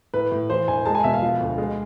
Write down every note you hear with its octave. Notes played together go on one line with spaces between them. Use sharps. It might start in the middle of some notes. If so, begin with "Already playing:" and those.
A2 B4
A2
E3 C5
E1 G#5
G#3 A5
G#5
B2 E5
F5
F3
D2
G#3